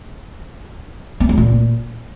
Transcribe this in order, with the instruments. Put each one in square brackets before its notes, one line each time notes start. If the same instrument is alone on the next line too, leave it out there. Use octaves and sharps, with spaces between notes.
[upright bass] B3
A3
A#2